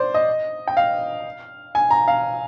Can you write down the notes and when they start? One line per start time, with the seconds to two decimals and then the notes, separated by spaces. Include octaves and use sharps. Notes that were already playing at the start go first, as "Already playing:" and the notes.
Already playing: C5 D5
0.14 D#5
0.67 G5
0.77 F5
1.75 G#5
1.91 A#5
2.08 F5